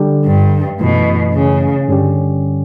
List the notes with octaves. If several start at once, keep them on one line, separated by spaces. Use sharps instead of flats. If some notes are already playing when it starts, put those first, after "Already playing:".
Already playing: D3 G3 D4 G4
G2
F#2 B2 E3 A3
C#3
G2 D3 G3 C#4 G4